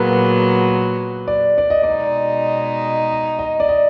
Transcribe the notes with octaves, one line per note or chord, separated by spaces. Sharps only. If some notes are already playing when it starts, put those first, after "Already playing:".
Already playing: A#2 F#3 B3 G#4 A#4 B4
D5
D5
D#5
B2 G#3 D#4 D5
D#5
D5
D#5